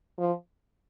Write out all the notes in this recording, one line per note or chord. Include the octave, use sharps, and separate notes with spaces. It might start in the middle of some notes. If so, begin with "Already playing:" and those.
F3